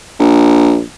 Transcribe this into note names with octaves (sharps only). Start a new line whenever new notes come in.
A#1